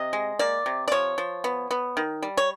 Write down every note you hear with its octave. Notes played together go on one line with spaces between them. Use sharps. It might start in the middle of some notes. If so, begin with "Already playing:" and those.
Already playing: C3 D#5
G#3
A#3 D5
C3
D5
F3 C#5
F3
B3
B3
D#3
G3
C#5